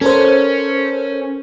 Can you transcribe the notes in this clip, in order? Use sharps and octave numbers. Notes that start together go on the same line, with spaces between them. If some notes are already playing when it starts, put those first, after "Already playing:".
C#4 A4 A#4 C5